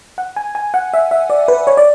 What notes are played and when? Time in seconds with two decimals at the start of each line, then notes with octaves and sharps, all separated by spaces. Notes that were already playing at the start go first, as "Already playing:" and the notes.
0.18 F#5
0.36 G#5
0.55 G#5
0.74 F#5
0.94 E5
1.11 E5
1.30 D5
1.48 B4
1.67 C#5
1.77 D5